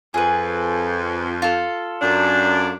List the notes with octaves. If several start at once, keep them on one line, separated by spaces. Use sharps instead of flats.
F2 G#4 B4
F4 A4
F#2 D4